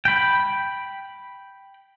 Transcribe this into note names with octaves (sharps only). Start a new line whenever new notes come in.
G5 B5